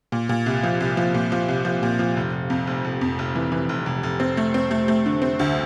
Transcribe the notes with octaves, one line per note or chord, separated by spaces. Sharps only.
A#2
A#2
C2
F3
C2
F3
A#2
F3
C2
F3
A#2
F3
F1
F1
F2
F1
F1
F2
F1
E3
E3
F1
F1
F1
C4
A3
C4
A3
A3
D3
C4
D2